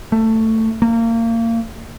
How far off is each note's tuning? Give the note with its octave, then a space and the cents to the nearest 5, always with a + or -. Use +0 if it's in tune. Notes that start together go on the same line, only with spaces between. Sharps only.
A3 +15
A#3 -30